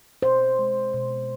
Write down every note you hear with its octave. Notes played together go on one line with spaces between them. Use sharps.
B2 C5
G#3
B2